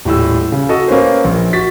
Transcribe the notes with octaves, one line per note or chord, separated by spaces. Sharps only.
D#1 A2 E6
C#3
F#4 A4 D#5
A#3 C#4 B4 C5
A#1
F#4 A6 B6